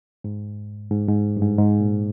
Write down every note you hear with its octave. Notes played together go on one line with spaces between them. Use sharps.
G#2
G#2
G#2
G2
G#2
G#2
A#2